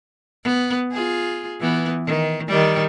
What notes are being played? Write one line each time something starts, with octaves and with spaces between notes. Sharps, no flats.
B3
F4 G#4
E3 B3
D#3
D#3 G3